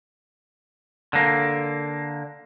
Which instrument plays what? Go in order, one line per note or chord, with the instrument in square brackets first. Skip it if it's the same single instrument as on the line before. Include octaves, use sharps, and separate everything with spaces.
[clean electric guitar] D3 A#3